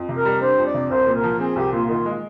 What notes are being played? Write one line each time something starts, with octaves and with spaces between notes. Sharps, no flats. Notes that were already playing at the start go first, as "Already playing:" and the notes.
Already playing: F2
C3
A#4
G3
D4 C5
F2
D5
C3
C2 C5
A#2
A#4
F3
C4 G#4
C2 G4
A#2 F4
D#3 F4
G#3